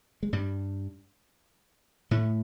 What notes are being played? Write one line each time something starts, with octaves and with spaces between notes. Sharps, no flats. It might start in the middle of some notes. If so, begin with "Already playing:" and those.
G#3
G2 G3
A2 A3